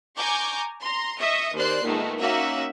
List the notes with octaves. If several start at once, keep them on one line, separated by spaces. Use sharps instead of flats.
G#5 A#5 C#6 D6 G6
A#5 C6
D#5 E5 C#6 D#6
D#2 C5 D5 C6 F#6 C7
A#2 D#3 G#3 A3 B3
A#3 C#4 D#4 F#4 E5